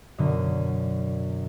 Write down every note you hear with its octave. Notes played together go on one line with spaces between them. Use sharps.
F#2 B2 D3